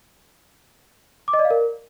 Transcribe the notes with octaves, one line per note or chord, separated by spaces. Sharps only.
D6
D#5
D5
F5
A#4